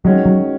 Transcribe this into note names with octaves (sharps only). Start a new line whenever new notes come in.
D#3 F#3 G#3 C#4 F#4
F#3